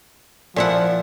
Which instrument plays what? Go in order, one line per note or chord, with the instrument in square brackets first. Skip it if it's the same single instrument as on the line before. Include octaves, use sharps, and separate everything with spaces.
[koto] A#2 E4 F#5 [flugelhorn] F3